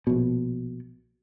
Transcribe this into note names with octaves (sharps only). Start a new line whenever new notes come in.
A#1 B2